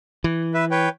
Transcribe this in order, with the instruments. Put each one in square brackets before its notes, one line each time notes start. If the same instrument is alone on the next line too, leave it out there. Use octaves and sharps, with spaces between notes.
[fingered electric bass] E3
[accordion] B4 E5
B4 C#5 G5